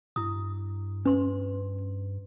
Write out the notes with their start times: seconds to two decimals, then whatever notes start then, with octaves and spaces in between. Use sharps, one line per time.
0.16 G2 E4 D#6
1.05 C#4 B4 C6